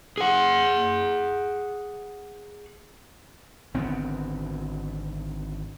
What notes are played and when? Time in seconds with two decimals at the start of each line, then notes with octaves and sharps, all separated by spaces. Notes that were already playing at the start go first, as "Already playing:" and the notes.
0.18 G#4 F#5
3.74 G#1 D3 B3 C4